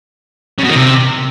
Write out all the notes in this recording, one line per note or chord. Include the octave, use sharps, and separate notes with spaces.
C#3
B2
D#3
C3